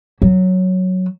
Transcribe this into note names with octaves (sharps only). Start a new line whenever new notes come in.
F#3